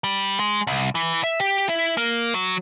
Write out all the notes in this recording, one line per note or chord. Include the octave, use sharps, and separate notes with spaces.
G3
G#3
C2
E3
E5
G4
E4
A#3
F#3